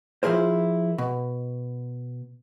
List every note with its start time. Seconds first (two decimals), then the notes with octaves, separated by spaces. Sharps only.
0.23 F3 E4 G#4 A#4 C5
0.98 B2